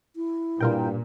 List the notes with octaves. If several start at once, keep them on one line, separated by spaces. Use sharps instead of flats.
E4
G2 A#2 F4 A#4 G5